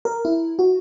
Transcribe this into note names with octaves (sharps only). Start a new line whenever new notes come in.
A#4
E4
F#4